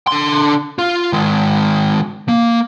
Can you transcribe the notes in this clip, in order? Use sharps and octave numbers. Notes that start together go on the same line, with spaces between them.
D3 C6
F4
D#3 G#3
A#3